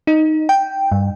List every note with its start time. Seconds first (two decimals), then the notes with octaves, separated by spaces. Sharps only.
0.07 D#4
0.49 G5
0.92 G2